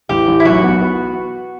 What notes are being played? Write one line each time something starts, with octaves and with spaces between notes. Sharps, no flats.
A1 G4
A1
E4
B1 F#4
B3
B3